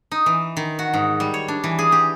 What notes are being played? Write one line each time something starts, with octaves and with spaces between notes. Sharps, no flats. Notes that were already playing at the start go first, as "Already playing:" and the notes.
D#4
E3
D#3
F#4
G#2
G3
C#5
D4
E3
G#4
G4